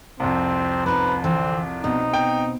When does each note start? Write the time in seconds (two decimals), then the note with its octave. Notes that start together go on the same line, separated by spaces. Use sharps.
0.20 C2 F2 C4
0.86 C#4 D#4 B4 C5
1.24 D3 E3 C4
1.84 B2 C4 D#4
2.13 G5